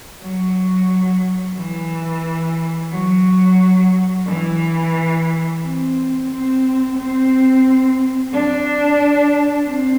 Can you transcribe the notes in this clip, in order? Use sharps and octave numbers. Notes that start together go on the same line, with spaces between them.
F#3
E3
F#3
E3
C4
C4
C4
D4
C4